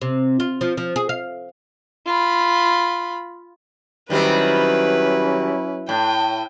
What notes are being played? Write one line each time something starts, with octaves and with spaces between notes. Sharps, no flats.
C3
F4
F3
F3
G#4
F5
F4 B5
D#3 F#3 G3 C4 C#4 E4 B4
A2 G5